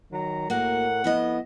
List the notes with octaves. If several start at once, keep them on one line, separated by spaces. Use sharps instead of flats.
D#3 F#3 A#5
A2 A#3 F#4 A#4 F#5
F2 B3 E4 D#5